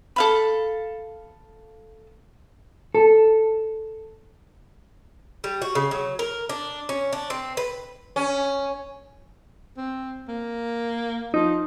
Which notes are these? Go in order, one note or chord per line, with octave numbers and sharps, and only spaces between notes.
A4 F5 B5
A4
G3
F#4
C#3
F#3
A#4
D4
C#4
D4
C4
B4
C#4
C4
A#3
F3 D#4